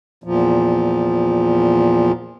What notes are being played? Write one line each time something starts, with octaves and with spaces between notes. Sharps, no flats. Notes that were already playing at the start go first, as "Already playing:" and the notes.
E2 A#2 F3